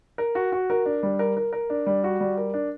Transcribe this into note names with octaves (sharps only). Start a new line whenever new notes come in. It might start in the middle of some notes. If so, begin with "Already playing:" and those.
A#4
F#4
F#4
A#4
D4
G3
A#4
A#4
A#4
D4
G3
F#4
G3
A#4
D4